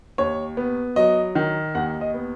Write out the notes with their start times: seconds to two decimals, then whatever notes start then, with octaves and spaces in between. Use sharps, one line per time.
0.18 D#2 C#5
0.57 B3
0.96 F#3 D#5
1.35 D#3
1.75 D#2 F#5
2.01 D#5
2.14 B3